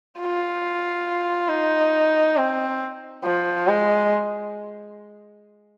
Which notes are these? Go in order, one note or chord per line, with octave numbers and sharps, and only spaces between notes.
F4
D#4
C4
F3
G#3